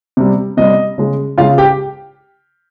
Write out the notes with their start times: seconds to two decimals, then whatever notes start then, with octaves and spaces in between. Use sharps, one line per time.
0.17 C3 G3
0.57 C3 G3 D#5
0.98 C#3 G#3
1.38 C#3 F4 F5
1.42 G#3
1.58 G4 G5